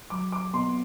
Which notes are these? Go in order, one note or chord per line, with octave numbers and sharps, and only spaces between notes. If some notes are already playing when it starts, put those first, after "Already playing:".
F#3 D6
D6
B2 C6